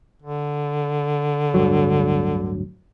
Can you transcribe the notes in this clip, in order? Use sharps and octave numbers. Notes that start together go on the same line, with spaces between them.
D3
D1 G2 F#3